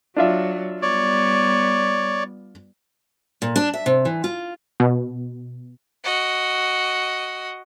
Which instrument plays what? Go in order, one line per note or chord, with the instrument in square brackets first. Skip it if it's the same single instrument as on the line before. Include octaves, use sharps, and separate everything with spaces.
[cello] F#3 [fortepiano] D4 F4 E5
[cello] G3 B3 [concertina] C#5 D5
[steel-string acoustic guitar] A#2
D4
E5
C3
E3
F4
[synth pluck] B2
[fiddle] F#4 D#5